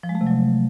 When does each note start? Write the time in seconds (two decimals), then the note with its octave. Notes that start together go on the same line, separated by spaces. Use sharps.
0.03 F3
0.09 G#3
0.15 A3
0.21 C3
0.27 F#3